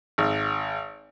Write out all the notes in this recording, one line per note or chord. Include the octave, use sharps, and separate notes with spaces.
G#1